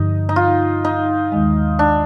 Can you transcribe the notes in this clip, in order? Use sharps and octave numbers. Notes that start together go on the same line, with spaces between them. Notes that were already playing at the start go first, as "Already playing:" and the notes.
Already playing: G2 D3 F3 D#4
D#4
F4
D#4
D#2 D#3 G#3
D4